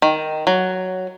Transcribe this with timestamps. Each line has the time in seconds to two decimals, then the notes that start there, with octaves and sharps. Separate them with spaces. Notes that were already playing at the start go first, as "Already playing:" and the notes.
0.02 D#3
0.47 F#3